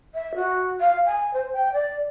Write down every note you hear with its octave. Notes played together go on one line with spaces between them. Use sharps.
E5
F#4
F5
G#5
C5
G5
D5